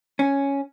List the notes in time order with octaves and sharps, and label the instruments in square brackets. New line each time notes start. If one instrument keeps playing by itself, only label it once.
[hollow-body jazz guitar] C#4